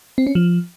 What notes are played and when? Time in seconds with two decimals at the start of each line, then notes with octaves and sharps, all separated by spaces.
0.18 C4
0.27 C#4
0.35 F3